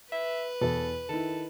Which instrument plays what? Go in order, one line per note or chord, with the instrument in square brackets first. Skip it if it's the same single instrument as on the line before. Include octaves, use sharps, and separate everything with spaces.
[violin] B4 [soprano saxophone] E5
[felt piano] E2 [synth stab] B2 E3 [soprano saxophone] A4
[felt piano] D#3 E4 [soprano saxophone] A4